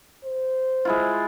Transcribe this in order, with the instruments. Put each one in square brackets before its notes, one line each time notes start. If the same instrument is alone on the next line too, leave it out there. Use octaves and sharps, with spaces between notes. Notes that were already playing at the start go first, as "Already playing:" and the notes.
[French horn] C5
[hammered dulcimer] G#3 E4 F4